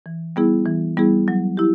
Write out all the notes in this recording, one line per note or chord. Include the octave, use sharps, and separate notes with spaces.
E3
G3 B3 E4 G#4
E3
G3 B3 E4 G#4
F#3
E4 G4